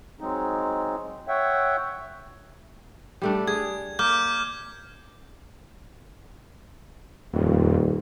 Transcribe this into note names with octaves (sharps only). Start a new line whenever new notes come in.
F#3 G#3 C4 D#4
C#5 E5 F#5 G5
G3 A3 D4
G#4 G#6
A#3 D6 F6 G6
D#1 F2